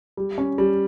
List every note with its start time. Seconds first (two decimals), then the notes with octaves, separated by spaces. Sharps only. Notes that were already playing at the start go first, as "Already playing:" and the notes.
0.17 G3
0.38 C#4
0.58 G3